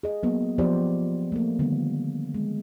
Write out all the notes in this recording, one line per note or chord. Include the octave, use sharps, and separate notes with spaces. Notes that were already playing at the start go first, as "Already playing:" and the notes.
G#4 D#5
F#3 A#3 B3
F3 B3 G4 C5 D5
A3 A#3
D3 D#3 G3 B3
G#3